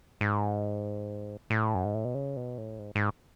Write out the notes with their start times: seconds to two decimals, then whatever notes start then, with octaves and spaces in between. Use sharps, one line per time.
0.21 G#2
1.50 A2
1.75 F#2
1.85 G#2
1.94 A2
2.05 B2
2.15 C#3
2.36 B2
2.58 A2
2.79 G#2
2.95 G#2